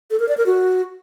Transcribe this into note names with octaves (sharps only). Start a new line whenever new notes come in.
A4
A#4
D5
A#4
F#4